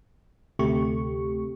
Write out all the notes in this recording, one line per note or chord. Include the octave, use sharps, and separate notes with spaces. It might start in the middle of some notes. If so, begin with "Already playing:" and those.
D2 C3 A3 G4 C#6